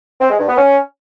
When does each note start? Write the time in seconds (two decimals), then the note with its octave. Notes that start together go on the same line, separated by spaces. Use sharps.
0.21 C4
0.30 G#3
0.39 G2
0.49 B3
0.58 C#4